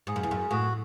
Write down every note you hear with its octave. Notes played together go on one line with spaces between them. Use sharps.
G#2 G#4
F#2
E2
F#2
A2 F#4